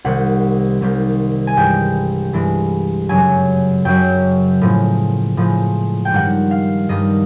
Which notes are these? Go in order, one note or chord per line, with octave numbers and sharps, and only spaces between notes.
C2 C3 D#3 G3 F#5
C2 C3 D#3 G3
G#5
G2 E3 G#3 G5
G2 E3 G#3
F#2 C#3 F#3 G#5
F#2 C#3 F#3 G5
A2 F3 G#3
A2 F3 G#3
G5
G2 D#3 G3 F#5
F5
G2 D#3 G3 D#5